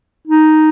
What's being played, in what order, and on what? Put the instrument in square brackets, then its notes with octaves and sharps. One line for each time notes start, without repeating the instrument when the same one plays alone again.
[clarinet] D#4